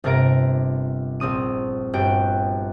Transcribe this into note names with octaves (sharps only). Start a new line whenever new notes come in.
G1 C3 F4 A#4 A#6 D7
A#1 C4 D#6 D#7
G1 F#4 G5 D7